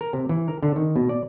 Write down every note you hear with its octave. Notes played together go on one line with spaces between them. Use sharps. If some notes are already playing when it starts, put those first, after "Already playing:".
A#4
C3
E3
A#4
D3
D#3
B2
D5